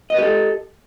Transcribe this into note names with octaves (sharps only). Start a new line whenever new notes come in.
G4 A4 B4 D#5